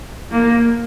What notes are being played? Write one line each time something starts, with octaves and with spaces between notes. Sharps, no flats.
A#3